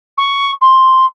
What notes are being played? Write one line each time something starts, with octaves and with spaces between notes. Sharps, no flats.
C#6
C6